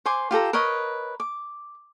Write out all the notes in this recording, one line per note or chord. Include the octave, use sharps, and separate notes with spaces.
C5 G#5 C6 D6
F4 G4 A4 A#5
A#4 B4 C#5 D#5
D6